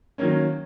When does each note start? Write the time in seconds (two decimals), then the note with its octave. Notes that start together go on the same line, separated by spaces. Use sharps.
0.18 D#3 F#3 A#3 C#4